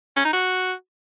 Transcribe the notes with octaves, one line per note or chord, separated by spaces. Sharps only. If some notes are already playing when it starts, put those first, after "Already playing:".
C#4
D#4
F#4